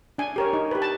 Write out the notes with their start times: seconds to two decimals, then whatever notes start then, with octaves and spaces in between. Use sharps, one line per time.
0.18 D4 G#5
0.36 G4 A#4 C#5
0.53 D#4
0.71 G4 B4
0.82 A5